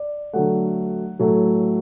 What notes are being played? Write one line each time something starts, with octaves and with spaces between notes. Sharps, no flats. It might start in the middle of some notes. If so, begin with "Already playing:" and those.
Already playing: D5
D3 F#3 A3 F#5
A2 F#3 A3